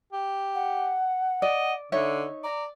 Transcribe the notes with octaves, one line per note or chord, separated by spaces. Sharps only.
G4
F#5
D5 D#5
D3 D#4 C#5 E5
D5 A#5